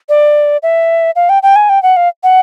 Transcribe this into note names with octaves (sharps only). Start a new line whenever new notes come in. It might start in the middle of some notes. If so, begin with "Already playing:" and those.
D5
E5
F5
G5
G5
G#5
G5
F#5
F5
F#5